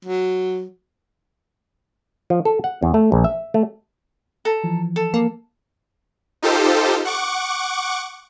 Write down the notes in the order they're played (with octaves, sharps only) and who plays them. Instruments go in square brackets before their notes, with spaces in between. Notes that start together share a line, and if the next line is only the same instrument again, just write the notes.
[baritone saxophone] F#3
[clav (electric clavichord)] F3
A4
F#5
E2
A3
A#1
E5
A3
[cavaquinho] A4 A#5
[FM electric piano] E3 F3
[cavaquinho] A4
[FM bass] A#3
[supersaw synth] D#4 F4 G4 A4 C5
F#5 C#6 D6